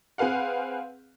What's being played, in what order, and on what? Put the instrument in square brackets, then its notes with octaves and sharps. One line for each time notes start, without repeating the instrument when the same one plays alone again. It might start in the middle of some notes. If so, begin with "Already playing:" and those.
[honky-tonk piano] C4 G#4 B4 F5 F#5